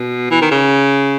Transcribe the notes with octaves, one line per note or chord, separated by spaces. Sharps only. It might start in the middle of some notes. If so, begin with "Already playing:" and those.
Already playing: B2
E3
D#3
C#3